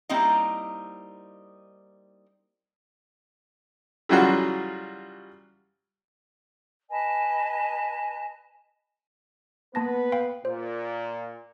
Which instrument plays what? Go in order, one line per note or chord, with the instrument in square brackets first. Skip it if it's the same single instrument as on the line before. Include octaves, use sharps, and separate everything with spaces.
[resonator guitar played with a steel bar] G3 A#3 C4 D#4 E4 D#5
[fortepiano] C#3 E3 F#3 G3 F4 F#4
[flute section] B4 D#5 G#5 A5
[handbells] A#3 A5 A#6 [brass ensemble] B3 B4
[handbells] F5 G5 B5
[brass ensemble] A#2 [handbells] C5